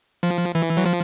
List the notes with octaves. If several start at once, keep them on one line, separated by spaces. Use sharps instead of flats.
F3
E3
F#3
F3